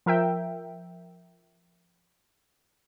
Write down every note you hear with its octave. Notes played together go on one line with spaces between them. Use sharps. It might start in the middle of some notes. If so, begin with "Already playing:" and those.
F3 A#4 E5 G5